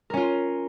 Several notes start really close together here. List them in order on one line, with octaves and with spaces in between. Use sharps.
A#4 C#4 F4